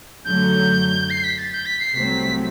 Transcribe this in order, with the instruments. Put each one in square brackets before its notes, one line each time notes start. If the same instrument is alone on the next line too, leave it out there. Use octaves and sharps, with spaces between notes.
[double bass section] F#2 D3 F#3 A3 [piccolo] G6
[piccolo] C7
B6
A6
G6
B6
C7
[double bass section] C2 C3 F#3 A3 C4 [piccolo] B6